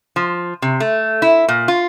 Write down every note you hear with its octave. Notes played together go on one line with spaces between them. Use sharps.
F3
C3
A3
E4
A#2
F4